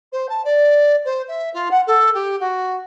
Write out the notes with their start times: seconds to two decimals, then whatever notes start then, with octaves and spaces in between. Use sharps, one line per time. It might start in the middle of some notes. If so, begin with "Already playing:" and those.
0.12 C5
0.29 A5
0.44 D5
1.05 C5
1.28 E5
1.53 F4
1.71 F#5
1.87 A4
2.14 G4
2.40 F#4